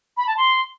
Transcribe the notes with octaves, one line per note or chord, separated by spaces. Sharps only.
B5
A5
C6